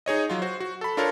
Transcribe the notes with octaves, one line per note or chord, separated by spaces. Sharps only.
D#4 G#4 C#5 D#5
F#3 F4
F#4 C5
F#4
A4 B5
D4 F4 A4 A#4 C#5